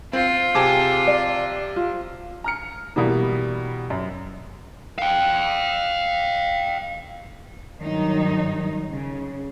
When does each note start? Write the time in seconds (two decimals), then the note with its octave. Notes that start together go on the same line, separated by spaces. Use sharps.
0.13 C4 F4 C5
0.55 C3 G#4 G5 A5 D6
1.07 D5
1.76 F4
2.44 A#5 F6 C#7
2.96 B2 E3 G3 A#3
3.90 F#2
4.98 F5 G5
7.80 G2 D#3 F#3 D#4
8.91 C#3